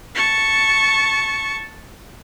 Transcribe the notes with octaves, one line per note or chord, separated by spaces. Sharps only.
A5 C#6